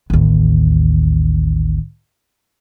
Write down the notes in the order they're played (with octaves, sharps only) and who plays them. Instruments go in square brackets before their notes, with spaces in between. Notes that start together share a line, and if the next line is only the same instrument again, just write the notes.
[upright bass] A1 D#2